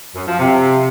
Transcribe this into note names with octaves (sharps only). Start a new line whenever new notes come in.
F#2
F3
C3